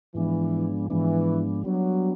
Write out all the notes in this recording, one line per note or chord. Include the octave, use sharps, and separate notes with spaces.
G#2 E3 F3 G#3 B3 D4
G#2 E3 F3 G#3 B3 D4
F#3 G3 B3 D4